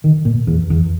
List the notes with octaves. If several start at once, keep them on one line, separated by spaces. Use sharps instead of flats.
D#3
A#2
E2
E2